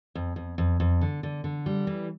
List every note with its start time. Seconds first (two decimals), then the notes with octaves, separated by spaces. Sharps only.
0.15 F2
0.36 F2
0.58 F2
0.80 F2
1.01 D3
1.23 D3
1.44 D3
1.66 G3
1.87 E3